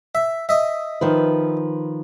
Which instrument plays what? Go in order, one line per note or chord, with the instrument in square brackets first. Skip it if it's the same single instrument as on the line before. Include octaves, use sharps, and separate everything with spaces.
[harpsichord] E5
D#5 E5
[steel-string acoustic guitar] D#3 F3 B4